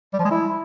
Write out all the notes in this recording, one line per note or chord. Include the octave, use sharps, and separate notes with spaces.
G3
F3
G#3
E4